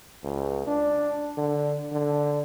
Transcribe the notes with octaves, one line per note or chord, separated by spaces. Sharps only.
C#2
D4
D3
D3